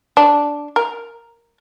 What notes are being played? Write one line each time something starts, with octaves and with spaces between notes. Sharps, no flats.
D4
A#4